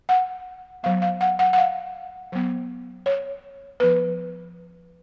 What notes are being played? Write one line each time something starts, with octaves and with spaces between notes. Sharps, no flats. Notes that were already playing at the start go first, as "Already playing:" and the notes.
F#5
F#3 B3 F5
F5
F#5
F#5
F#5
F5
F#3 B3
C#5
F3 B3 B4